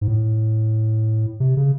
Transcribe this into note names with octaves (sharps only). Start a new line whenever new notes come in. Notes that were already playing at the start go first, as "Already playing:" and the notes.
G#2
A2
C3
C#3